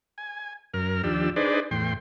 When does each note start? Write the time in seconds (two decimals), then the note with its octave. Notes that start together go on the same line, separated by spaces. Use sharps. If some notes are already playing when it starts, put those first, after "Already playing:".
0.18 G#5
0.74 F#2 A#4 F6
1.03 D#2 F3 D4 G4 E6
1.36 D4 D#4 G#4 B4 C5 D5
1.71 E2 A2 G5 C6